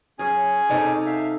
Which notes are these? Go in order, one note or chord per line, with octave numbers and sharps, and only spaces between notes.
F#2 C#4 G#4 G#5
C3 D#4 A4
E5 F5